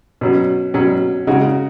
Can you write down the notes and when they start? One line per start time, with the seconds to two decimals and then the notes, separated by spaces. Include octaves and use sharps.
0.21 B2 F#3 C#4
0.74 B2 F#3 C#4
1.27 C#3 G#3 D#4 F#4